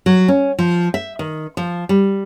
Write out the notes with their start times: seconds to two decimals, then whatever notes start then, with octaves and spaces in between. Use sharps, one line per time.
0.06 F#3
0.28 C#4
0.59 F3
0.94 E5
1.19 D#3
1.57 F3
1.89 G3